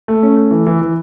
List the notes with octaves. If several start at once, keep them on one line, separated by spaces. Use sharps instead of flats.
A3
C#4
A3
E3
E3
E3